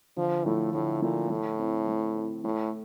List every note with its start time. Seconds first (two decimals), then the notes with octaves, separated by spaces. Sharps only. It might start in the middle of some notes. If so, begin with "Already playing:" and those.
0.17 D3 F3
0.45 A2 F3 A3 E4 A4
0.73 A2 D3
1.02 A#2 F3 A3 E4 A4
1.30 A2 A3
1.59 C4 E4
1.88 A3
2.15 C4 E4
2.44 A2 A3